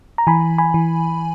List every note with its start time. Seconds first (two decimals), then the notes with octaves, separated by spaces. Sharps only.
0.18 A#5
0.27 E3 G#5 B5
0.58 G#5 B5
0.74 E3